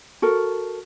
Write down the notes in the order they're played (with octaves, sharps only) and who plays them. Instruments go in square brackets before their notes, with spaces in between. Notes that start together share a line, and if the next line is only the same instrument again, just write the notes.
[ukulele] F#4 A4 A#4